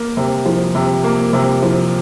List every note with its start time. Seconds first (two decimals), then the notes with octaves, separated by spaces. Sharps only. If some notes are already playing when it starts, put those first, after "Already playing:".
Already playing: A#3
0.17 C3
0.45 F3
0.75 C3
1.04 A#3
1.33 C3
1.62 F3